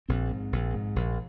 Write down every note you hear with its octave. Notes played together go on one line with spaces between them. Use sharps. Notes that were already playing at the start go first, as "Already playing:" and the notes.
A#1 C4
G#2
A#1
G#2
A#1